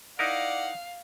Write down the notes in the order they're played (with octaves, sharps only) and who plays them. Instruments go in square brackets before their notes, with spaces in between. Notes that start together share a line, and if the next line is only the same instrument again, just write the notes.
[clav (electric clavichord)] D#4 E4 A#4 [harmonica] D5 F#5 [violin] F5